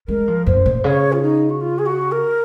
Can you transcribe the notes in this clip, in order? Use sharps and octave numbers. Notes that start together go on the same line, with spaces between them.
G#3 A#4
F3
F#2 C5
A#2
C#3 C#5
F4
D#4
F#4
F4
G#4
F#4
A#4